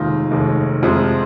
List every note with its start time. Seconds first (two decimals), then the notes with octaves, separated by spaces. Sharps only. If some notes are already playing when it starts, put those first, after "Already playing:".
Already playing: F1 D#2 D#3 G#3 D#4 F4
0.31 F1 D#2 D#3 G#3
0.83 F2 C3 F3 G#3